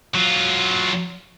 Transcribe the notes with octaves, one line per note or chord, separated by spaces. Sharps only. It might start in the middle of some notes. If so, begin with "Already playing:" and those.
F#3 F4